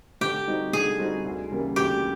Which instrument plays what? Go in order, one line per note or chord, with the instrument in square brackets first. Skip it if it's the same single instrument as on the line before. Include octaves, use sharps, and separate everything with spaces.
[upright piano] D3 [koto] G4
[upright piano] G3 C4 D#4 F#4
[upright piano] D3 [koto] G#4
[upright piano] G3 C4 D#4 F#4
D2
C#3 E3 G3 A#3
[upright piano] D2 [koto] G4